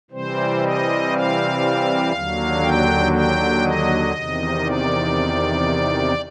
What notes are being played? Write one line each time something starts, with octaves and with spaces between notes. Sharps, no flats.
C3 E3 G3 C4 C5
D#5
F5
D#2 D3 F#3
G5
G5
D#5
E2 C3 D#3
D5